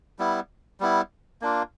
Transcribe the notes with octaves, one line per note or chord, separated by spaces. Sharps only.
G3 B3 E4
G3 B3 E4
A#3 D4 F4